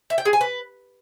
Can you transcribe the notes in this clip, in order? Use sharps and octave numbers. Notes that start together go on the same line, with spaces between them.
E5
G5
G#4
G#5
B4